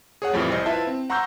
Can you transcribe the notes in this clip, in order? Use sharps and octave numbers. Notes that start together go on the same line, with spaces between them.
G#4 C#5 F#5
F2 A2 E3 F3 G3
C2 C5 D#5
E4 F4 B4 E5 A5
C4
F#5 A#5 C6 C#6 E6 G6